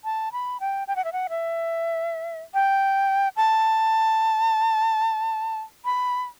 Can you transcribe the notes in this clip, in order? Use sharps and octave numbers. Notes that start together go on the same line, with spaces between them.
A5
B5
G5
G5
F#5
E5
F#5
E5
G5
A5
B5